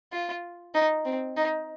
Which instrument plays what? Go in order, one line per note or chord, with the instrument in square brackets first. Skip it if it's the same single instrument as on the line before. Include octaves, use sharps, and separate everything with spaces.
[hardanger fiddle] F4
D#4
C4
D#4